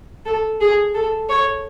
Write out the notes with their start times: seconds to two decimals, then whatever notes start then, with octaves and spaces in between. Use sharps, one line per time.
0.25 A4
0.61 G#4
0.95 A4
1.29 C#5